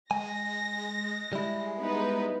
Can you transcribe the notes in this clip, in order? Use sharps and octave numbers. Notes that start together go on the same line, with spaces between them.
G#3 G#5 A#6
G3 E4
B3 D#4 B4